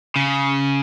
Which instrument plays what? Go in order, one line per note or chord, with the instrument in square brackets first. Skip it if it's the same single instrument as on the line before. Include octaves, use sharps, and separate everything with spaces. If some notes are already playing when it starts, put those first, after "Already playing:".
[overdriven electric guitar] C#3